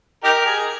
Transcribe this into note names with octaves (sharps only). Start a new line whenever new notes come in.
D#4 G4 A#4
G#4